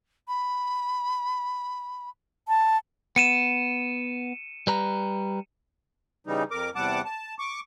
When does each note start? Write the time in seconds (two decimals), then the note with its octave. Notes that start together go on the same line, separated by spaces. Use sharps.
0.28 B5
2.48 A5
3.16 B3 C#7 D#7 E7
4.67 G3 B4 A#5
6.27 C#3 E3 G3 D#4
6.51 F2 A#4 D6
6.76 E2 C3 G3 F#5 A5 D6
7.05 A5
7.39 C#6 D6